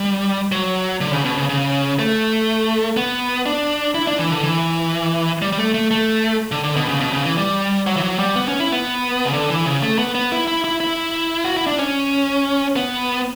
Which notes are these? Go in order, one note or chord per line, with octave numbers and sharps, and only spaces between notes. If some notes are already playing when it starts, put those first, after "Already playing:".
Already playing: G3
F#3
D3
C#3
B2
C#3
C#3
A3
B3
D4
E4
D4
E3
D3
E3
G3
G3
A3
A3
A3
D3
D3
B2
C#3
B2
C#3
E3
G3
F#3
E3
F#3
G3
B3
C#4
E4
B3
C#3
D3
E3
C#3
A3
B3
B3
E4
E4
E4
E4
F#4
E4
D4
C#4
B3